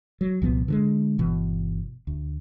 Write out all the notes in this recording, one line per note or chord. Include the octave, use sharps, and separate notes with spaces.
F#3
C2 A#2 F3 B3
D3 E3 G#3
G1 B2 E3
D2